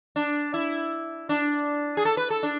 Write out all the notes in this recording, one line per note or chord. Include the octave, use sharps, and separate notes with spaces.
D4
E4
D4
G#4
A4
B4
A4
D4